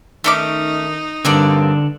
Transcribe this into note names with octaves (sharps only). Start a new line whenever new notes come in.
D#3 A3 C#4 D#4 D6
G2 D3 A#3 C4 D4 D5